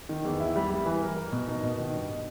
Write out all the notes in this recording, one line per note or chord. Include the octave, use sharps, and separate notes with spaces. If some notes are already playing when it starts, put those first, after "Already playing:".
D#3
E2
E4
G3
G3
E3
A#4
A#4
B2
D#4
B2
D#3
G2